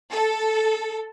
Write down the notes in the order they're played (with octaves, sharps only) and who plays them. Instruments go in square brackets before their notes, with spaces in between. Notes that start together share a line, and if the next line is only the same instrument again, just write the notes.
[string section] A4